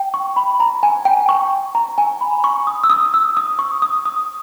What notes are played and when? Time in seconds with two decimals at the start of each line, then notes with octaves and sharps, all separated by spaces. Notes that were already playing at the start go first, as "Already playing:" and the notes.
Already playing: G5
0.14 C#6
0.36 B5
0.60 A#5
0.83 G#5
1.05 G5
1.29 C#6
1.75 A#5
1.98 G#5
2.21 B5
2.44 C#6
2.67 D#6
2.84 E6
2.90 D#6
3.14 E6
3.37 D#6
3.59 C#6
3.82 D#6
4.05 D#6